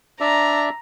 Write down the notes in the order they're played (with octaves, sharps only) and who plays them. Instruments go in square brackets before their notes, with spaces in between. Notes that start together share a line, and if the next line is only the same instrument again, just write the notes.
[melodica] D4 D5 E5 [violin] A#5